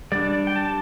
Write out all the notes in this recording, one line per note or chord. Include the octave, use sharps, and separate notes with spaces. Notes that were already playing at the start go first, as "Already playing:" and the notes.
G3 D4 D5
G5
A5